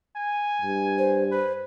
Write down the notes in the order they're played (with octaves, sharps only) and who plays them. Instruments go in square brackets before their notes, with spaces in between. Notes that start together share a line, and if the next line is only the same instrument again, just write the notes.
[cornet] G#5
[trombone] G2
[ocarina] C5
[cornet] B4 [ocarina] C5